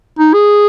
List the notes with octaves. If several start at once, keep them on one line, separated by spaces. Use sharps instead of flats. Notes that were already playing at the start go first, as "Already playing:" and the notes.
D#4
G#4